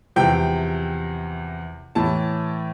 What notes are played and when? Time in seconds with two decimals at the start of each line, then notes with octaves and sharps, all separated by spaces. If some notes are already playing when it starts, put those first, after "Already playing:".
0.16 E2 C3 F3 G5
1.95 A2 E3 A5